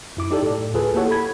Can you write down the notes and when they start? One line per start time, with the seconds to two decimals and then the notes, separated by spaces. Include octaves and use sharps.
0.17 F#2 E4 D6
0.31 D#4 G4 A4 D5
0.42 A2
0.74 D2 F4 G#4 A4 B4
0.95 A#3 E4 G4 A4 C#5 F#5
1.11 B5 G#6